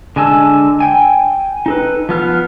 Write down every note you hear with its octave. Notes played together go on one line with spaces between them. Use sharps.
D3 G#3 G#5 A5 E6
G5 G#5
D#4 A4 B4
F3 B3 F6